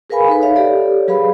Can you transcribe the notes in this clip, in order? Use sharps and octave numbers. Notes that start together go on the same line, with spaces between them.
G#4 A#4 B4 F5 G#5 B5
D#4 A4 B4
C#5 E5 F5
G4 A4 C#5 D5
F#3 G#4 B4 F5 B5